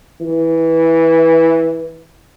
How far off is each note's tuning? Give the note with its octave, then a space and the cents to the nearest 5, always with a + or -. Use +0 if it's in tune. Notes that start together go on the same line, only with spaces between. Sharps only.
E3 -10